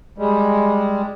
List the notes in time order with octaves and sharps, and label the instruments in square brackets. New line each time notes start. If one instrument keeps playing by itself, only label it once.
[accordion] G3 G#3